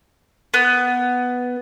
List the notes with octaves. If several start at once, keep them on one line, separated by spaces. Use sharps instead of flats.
B3